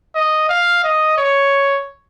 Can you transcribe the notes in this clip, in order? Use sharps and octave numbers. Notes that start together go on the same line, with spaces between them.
D#5
F5
D#5
C#5